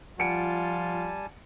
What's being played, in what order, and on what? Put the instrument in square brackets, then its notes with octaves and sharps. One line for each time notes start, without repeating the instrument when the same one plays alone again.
[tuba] F3 [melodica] G3 G#5 A5 [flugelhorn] F4 [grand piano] F#5 C#7 D7